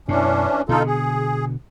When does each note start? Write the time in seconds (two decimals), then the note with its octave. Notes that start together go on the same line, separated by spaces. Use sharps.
0.09 F#2 B2 E3 C#4 D4
0.69 B2 D3 D#4 F4 A4
0.86 G#4